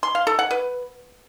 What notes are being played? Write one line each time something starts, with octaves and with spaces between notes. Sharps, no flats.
C6
F5
A4
F#5
B4